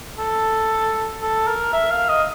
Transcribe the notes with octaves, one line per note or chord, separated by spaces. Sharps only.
A4
A4
A#4
E5
F5
D#5